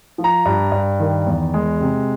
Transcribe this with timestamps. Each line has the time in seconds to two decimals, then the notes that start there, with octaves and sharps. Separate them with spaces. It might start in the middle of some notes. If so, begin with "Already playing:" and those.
0.18 F3
0.24 A#5
0.45 G2
0.72 G2
1.00 D#3
1.27 E2
1.54 G#3
1.81 C3